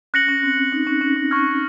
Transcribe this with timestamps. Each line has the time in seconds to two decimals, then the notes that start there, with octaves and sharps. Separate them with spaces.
0.14 C#4 F#6 A#6 C#7 F#7
0.28 C#4
0.43 C4
0.58 C#4
0.72 D#4
0.87 C#4
1.01 C#4
1.16 C#4
1.31 C#6 F6 G#6